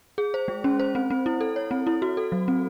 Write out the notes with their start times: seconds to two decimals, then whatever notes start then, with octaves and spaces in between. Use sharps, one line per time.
0.18 G#4
0.34 C5
0.48 G#3
0.64 C#4
0.79 C5
0.95 C4
1.10 C4
1.26 E4
1.41 A4
1.56 C#5
1.71 C4
1.87 E4
2.02 F#4
2.17 A4
2.32 F#3
2.48 C4